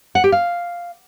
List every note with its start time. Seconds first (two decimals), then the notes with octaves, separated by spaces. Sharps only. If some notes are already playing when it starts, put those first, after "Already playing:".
0.15 F#5
0.24 G4
0.32 F5